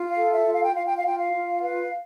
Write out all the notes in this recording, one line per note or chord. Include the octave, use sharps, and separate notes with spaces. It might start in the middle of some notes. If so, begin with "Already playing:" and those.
Already playing: F4
F5
A4
E5
F4
F5
G5
F4 F5
G5
F5
F4 G5
F5
F4
B4 F5